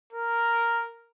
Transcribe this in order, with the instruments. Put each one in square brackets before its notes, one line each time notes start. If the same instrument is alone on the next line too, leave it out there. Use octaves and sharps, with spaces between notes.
[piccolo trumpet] A#4